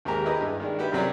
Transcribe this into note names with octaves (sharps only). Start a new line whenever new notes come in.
D#2 G#2 G4 G#4 A#4 A#5
E4 G4 G#4 B4 D#5
G2
D#3 G#3 D4
F#4 G4 B4 E5
C2 F#2 C3 F#3 A#4 D5